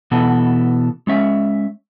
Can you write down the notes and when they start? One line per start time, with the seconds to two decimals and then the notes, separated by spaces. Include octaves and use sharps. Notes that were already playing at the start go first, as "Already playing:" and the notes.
0.11 B2 E3 B3 A4
1.07 G#3 C#4 E5